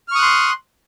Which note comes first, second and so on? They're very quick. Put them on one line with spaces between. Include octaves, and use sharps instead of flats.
F6 C#6 D#6 F#6 C6